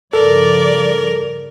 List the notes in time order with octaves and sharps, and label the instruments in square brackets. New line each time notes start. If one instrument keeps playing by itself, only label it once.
[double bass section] G2 C#3 F3 [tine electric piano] A4 [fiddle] A#4 [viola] D5